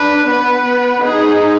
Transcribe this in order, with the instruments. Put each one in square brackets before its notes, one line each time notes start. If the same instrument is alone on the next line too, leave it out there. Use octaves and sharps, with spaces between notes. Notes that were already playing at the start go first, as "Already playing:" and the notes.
Already playing: [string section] D4 [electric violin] B4
[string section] B3 [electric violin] B4
[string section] D#4 [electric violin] G#4